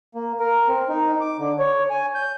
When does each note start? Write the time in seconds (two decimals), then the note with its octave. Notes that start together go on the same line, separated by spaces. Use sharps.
0.15 A#3
0.40 A#4
0.68 C4
0.89 D#4
1.21 D6
1.39 D3
1.59 C#5
1.90 G#5
2.15 G6